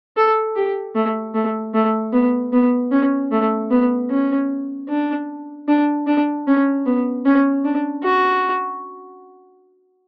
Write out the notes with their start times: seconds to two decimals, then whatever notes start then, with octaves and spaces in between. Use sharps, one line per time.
0.17 A4
0.56 G4
0.95 A3
1.34 A3
1.74 A3
2.13 B3
2.53 B3
2.92 C#4
3.32 A3
3.71 B3
4.11 C#4
4.89 D4
5.68 D4
6.07 D4
6.47 C#4
6.86 B3
7.25 C#4
7.65 D4
8.04 F#4